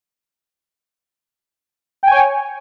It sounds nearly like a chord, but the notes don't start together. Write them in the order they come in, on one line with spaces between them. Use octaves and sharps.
G5 G#5 C#5